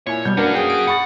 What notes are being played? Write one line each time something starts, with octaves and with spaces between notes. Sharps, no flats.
A#2 E4 C#5 G#5
B2 G3 G6
A#3 C#4 D4 F#4 A#4 B4
G#4 G5
D7
F#5 B5 C#6 A6